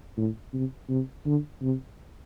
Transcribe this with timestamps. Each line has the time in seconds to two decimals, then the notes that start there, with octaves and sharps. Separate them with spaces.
0.17 A2
0.54 C3
0.89 C3
1.26 D3
1.62 C3